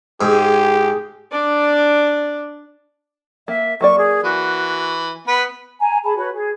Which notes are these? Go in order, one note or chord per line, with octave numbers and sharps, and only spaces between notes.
G#2 G4 G#4
D4 D5
A#3 E5
F#3 A#3 D5 C#6
G#4
E3 F#4
B3 B4 B5
G#5 A#5
G#4 A5 B5
F#4 B4 C#5 B5
G#4